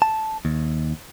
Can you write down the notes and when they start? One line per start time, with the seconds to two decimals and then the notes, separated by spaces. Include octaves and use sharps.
0.02 A5
0.45 D#2